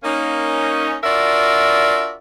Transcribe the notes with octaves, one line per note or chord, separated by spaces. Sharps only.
A#3 C#4 D#4
D4 F4 F#4 A#4 D5 E5